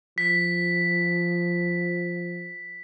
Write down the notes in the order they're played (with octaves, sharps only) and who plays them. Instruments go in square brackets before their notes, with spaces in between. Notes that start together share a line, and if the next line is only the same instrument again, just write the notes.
[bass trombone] F3 [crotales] B6